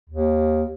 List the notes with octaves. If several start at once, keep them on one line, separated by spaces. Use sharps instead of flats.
D#2